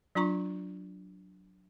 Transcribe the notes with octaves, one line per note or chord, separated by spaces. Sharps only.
F#3 D4 F4 A#5 C#6